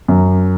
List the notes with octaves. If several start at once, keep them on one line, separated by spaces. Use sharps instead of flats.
F#2